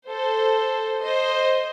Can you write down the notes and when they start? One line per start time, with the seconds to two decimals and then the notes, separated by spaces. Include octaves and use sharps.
0.08 A4 C5
1.02 C5 D#5